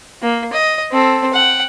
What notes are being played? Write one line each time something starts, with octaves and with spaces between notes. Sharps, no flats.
A#3
D#5
C4 A4
F#5 G5